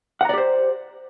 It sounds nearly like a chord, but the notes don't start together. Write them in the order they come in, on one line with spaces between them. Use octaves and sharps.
F#5 A#5 D5 G4 C5